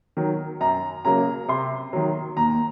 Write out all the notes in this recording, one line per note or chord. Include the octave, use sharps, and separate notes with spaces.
D#3 F#3
F#2 A#5
C#3 F#3 A#3 A#5
C3 C6
D#3 F#3
D#2 A#5